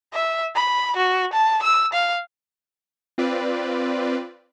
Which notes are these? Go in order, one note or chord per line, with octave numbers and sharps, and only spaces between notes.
E5
B5
F#4
A5
E6
F5
C4 F4 B4 D5